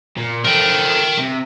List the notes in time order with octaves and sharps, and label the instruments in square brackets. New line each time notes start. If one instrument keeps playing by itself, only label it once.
[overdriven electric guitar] A#2
[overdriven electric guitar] F3 A3 [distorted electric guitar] A#4 G5
[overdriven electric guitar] C3